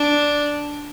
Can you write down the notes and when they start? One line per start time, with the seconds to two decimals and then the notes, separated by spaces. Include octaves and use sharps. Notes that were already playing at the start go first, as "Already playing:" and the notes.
Already playing: D4